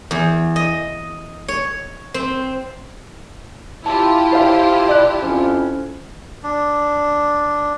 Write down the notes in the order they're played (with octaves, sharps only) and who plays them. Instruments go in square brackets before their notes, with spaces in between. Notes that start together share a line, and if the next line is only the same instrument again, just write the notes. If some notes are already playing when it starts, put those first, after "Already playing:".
[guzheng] E2
D#5
C#5
C4
[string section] E4 F4 G4 [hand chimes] A5
[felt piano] C5 F5
D5 F#6
[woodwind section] F2 C#4
[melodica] D4